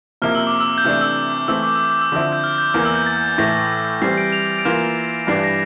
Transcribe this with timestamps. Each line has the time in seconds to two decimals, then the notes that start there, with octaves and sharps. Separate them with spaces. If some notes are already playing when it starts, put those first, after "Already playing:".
0.22 C3 F3 A#3 E4 F6
0.35 E6
0.47 D6
0.60 E6
0.78 G6
0.84 C3 E3 A3 D4 F6
1.01 E6
1.48 E3 A3 C4 E6
1.63 D6
1.75 E6
1.79 D6
1.90 D6
2.01 E6
2.12 D3 F3 C4 E4
2.33 G6
2.44 F6
2.58 G6
2.74 E2 E3 A#3 F6
2.85 E6
2.95 G6
3.06 A6
3.16 G6
3.28 A6
3.38 A2 E3 A3 A#6
4.02 E3 G3 C4 C7
4.17 D7
4.32 F7
4.59 D7
4.65 E3 A#3 F4 E7
5.27 G2 E3 G3 D4 C7
5.44 A#6